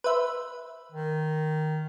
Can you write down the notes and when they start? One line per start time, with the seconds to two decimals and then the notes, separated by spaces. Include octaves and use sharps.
0.04 B4 C5 E5
0.92 D#3